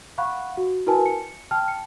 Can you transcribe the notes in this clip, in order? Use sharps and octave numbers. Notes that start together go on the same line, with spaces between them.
F5 F#5 B5 C#6 F#6
F#4
E4 F#4 A#4 B4 G#5 A5
C#7
G5 A5 F6
C#7